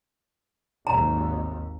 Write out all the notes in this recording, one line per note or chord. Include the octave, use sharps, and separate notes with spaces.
G#1 D#2 A#5